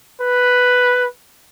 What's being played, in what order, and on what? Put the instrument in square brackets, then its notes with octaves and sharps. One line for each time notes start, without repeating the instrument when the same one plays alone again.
[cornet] B4